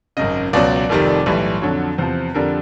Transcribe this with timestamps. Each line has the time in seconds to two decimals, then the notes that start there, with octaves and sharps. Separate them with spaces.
0.17 G#1 F#2 C#3 D#5
0.53 C#2 B2 F#3 D5
0.89 F1 F2 C3 D#3 G3
1.26 B1 A2 E3 G3
1.62 F2 D3 F#3 C#5
1.98 E2 C3 F3 C5
2.34 F2 D3 G3 A#4